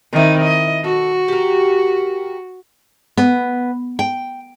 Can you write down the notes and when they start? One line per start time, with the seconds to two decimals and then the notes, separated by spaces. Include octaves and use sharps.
0.13 D#3 C4 D#4 E4 A#4
0.44 D#5
0.84 F#4 A4
1.28 G4 A#4
3.17 B3
3.99 G5